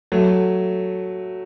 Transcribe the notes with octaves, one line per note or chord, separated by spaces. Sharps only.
F#3 A3